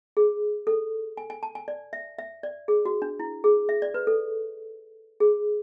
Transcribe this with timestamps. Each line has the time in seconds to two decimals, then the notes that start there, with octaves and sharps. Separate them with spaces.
0.17 G#4
0.67 A4
1.17 G#5
1.30 G#5
1.43 A5
1.55 G#5
1.68 D5
1.93 E5
2.19 E5
2.43 D5
2.68 G#4
2.85 F#4
3.02 D4
3.20 E4
3.44 G#4
3.69 E5
3.82 D5
3.94 B4
4.07 A4
5.20 G#4